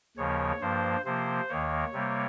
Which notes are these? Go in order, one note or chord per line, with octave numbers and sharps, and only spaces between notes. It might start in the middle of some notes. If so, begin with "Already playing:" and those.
D#2 C#3 F3 A#3 C#5
G2 F3 A#3 C5
C3 F3 A#3 C5
D#2 D#3 A#3 C#5
C3 G3 A#3